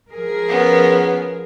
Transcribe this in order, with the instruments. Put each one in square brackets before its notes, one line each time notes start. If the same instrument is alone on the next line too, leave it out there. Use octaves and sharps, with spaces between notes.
[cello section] F3 G#4 A#4
[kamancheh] B3 C#4